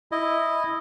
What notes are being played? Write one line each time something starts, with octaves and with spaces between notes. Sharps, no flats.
E4 D#5